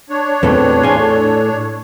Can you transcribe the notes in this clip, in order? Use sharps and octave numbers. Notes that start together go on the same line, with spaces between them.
D4 C#5
E2 A#2 A3 C4 B4
A2 G#4 F5 G#5 C6
A4